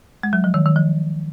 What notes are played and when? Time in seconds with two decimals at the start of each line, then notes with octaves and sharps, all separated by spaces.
0.23 G#3
0.33 F#3
0.44 F3
0.54 D#3
0.66 D#3
0.76 F3